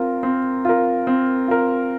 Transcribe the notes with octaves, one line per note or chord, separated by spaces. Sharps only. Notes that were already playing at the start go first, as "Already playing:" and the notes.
Already playing: C4 F4 A#4
C4
F4 A#4
C4
F4 A#4